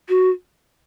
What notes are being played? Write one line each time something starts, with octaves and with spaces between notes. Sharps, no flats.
F#4